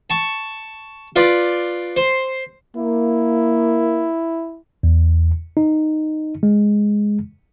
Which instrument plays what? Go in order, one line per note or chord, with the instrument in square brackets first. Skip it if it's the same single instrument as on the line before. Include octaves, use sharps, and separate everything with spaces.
[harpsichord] A5 C#6
F4 B4 D5
C5
[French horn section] A#3 [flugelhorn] E4
[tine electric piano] E2
D#4
G#3